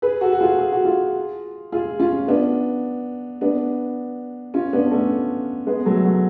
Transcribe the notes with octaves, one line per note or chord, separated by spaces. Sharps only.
G#4 B4
F#4 A4
F#4
F4 G#4
G#4
F#4
F4 G#4
F4 G#4
C#4 F4
B3 D4
B3 D4
C#4 F4
B3 D4
D4
A3 C#4
G#3 B3
F#3 A3
F#3